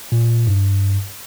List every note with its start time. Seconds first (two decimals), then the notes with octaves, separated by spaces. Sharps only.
0.12 A#2
0.47 G2